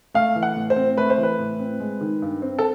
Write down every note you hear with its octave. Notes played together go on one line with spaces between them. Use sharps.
A3 F5
E3
F#5
A2
C5
C4
A3 B4
C5
E3
B4
A2
C4
G#3
D#3
G2
C4
A4